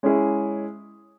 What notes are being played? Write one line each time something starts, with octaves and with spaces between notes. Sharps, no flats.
G#3 C#4 E4 G#4